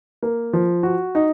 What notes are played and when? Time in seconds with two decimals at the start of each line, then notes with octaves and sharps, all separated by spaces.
0.23 A#3
0.53 F3
0.83 F#4
1.15 D#4